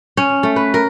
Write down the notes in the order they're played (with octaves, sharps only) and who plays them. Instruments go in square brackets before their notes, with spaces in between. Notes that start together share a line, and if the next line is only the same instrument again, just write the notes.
[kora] C#4
A3
B4
A#4